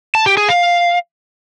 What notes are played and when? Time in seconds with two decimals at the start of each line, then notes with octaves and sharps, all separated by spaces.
0.15 A5
0.26 G4
0.37 G#4
0.49 F5